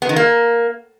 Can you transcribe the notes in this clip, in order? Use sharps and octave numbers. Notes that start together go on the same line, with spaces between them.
B3
D#3
A#3